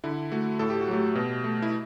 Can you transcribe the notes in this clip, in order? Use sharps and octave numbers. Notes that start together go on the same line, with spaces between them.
D3 E4
A3 F#4
A2 A4
G4
F#4
F#3 A3 G4
B2
A3
E4